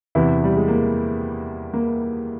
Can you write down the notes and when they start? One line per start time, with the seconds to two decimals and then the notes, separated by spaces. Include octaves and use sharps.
0.15 E2 C3 E3 E4
0.44 G3
0.56 G#3
0.68 A#3
1.74 A#3